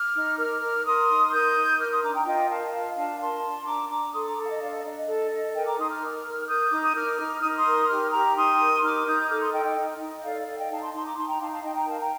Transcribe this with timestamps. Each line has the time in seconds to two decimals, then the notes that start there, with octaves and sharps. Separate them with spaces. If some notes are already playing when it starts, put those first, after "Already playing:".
Already playing: D6 F6
0.15 D#4
0.39 A#4 D6 F6
0.61 A#4
0.85 A#4 C6 D#6
1.09 D#4
1.32 A#4 D#6 G6
1.56 D#4
1.79 A#4 D6 F6
1.91 C6 D#6
2.02 D4 A#5 D6
2.14 G5 A#5
2.25 F4 D#5 G5
2.49 A#4 F5 A5
2.73 F4 F5 A5
2.96 D4 F5 A5
3.20 A#4 A5 C6
3.44 D4
3.66 D4 A#5 D6
3.90 D4 A#5 D6
4.13 A4 C6 D#6
4.25 A#5 D6
4.37 A4
4.44 F5
4.49 D#5
4.60 D4 D5 F5
4.72 D#5
4.84 D4 D#5
4.95 D#5
5.07 A4
5.31 A4
5.54 A#4 D#5 G5
5.65 A#5 D6
5.77 D#4 C6 D#6
5.89 D6 F6
6.01 A#4
6.25 A#4
6.47 A#4 D#6 G6
6.69 D#4 D6
6.82 D#6
6.95 A#4 D6 F6
7.19 D#4
7.41 D#4 D#6
7.49 D6
7.57 C6 D#6
7.66 A#4
7.88 G4 D6 F6
8.12 G4 A#5 D6
8.35 D#4 C6 D#6
8.59 A#4
8.82 D#4 D6 F6
9.05 D#4 D#6 G6
9.23 D#6
9.29 A4 D6 F6
9.41 C6 D#6
9.52 A4 D#5 G5
9.64 D#5 G5
9.76 D#4 D#5
9.99 D#4
10.23 A4 D5 F5
10.35 D5
10.46 A4 D5 F5
10.58 D#5 G5
10.70 D#4 F5 A5
10.81 A5 C6
10.93 D#4 A5 C6
11.05 A#5 D6
11.16 D#4 A5 C6
11.28 G5 A#5
11.40 D#4 F5 A5
11.48 A#5
11.52 F5 A5
11.63 D#4 D#5 G5
11.75 G5 A#5
11.87 A#4 F5 A5
11.99 G5 A#5